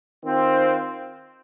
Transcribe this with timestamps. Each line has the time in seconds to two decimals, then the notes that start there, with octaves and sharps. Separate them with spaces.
0.23 D#3 C4 F4